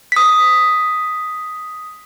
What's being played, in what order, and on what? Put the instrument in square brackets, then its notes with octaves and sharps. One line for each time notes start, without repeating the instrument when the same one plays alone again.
[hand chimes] D#6 B6